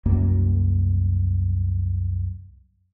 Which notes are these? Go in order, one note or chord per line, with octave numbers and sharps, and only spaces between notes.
C2 F#2 A#3